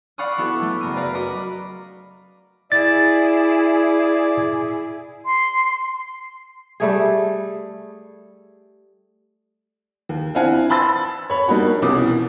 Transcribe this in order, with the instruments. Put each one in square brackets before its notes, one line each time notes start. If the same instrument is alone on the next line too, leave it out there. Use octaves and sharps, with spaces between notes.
[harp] D5 F5 F#5 B5 C#6 D#6
B3 E4 F#4 A4 B4
F#3 A3
F#1 A#4 B5 D#7
B4 D5 F5 A#5
F#4 A#4 D#5 A#5 B5 D6
[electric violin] E4 G#4 [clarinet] D5 [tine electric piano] A6
[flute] C6
[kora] G3 A3 G#4
[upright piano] D#2
C4 D4 E4 F5 F#5 G#5
A5 B5 C6 E6 A6
C#5 B5
G3 A#3 D4 D#4 F#4
C2 B2 E3 C#4 D6 D#6